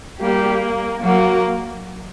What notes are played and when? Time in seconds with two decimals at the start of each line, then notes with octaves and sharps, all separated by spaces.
0.21 G3 A#3 G4
1.03 F#3 A#3 F#4